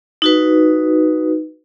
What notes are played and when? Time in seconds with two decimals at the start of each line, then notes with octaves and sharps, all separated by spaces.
0.22 D#4 F#4 B4